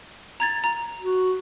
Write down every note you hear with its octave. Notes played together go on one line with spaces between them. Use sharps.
A#5 G#6 A6
A#5
F#4